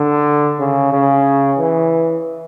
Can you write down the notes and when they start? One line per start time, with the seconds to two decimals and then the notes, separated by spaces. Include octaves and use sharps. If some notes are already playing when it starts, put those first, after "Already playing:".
Already playing: D3
0.59 C#3
0.92 C#3
1.58 E3